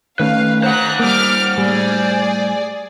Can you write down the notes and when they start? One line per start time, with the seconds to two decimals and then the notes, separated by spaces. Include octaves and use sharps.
0.19 D#3 A3 C#4 B4 F5
0.63 C5 F#5 A#5 F#6
0.99 G3 A#3 D6 F6
1.57 A2 G3 G#4 D5